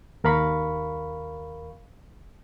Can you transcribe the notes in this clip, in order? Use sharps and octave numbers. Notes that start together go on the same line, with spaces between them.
D#2 A#4 F5 B5 C#6